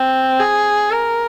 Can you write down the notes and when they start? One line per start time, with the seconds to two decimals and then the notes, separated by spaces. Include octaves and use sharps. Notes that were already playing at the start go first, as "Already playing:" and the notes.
Already playing: C4
0.39 G#4
0.91 A#4